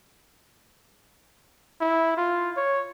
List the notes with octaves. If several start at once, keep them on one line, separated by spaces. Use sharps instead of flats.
E4
F4
C#5